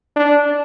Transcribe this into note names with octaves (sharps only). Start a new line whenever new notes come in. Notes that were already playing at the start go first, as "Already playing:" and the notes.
D4